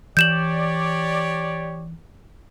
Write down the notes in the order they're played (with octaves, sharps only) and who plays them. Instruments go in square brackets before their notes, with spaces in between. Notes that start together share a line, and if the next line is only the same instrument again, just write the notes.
[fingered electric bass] E3 [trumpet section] G4 C#5 D5 [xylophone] G6 E7 F#7